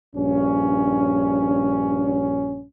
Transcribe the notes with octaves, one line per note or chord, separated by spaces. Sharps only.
A#1 G2 C#4